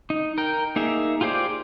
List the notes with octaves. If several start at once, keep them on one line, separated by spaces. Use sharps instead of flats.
D#4
A#4 G5
A#3 D#4 G#4 E5
F4 G4 G#4 C5 D5